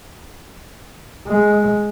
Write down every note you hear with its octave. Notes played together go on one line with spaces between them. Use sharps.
G#3